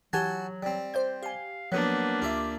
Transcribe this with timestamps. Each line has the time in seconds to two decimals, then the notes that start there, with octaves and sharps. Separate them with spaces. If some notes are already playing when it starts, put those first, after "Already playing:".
0.13 E3 F#3 F#4 G4 G#5 A5
0.63 G3 C4
0.94 C5 D5 G6
1.23 G4 F5 G#5
1.72 F3 F#3 A#3 B3 D4 B4
2.22 D2 F4 G4 E5